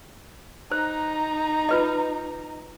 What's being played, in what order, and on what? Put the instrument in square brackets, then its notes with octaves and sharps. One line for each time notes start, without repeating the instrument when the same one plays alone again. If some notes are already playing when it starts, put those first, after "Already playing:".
[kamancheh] D#4 A#5 [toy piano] C5
[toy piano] F4 B4 D#5